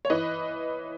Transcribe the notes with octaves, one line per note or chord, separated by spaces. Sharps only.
C#5
E3 B4 D#5